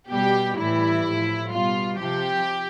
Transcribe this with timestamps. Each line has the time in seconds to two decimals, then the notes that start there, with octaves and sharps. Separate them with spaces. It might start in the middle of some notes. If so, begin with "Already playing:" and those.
0.10 B2 G3 G4
0.58 A2 E3 G3 E4
1.05 A2 F3
1.52 B2 G3 F4
1.99 C3 F3 G4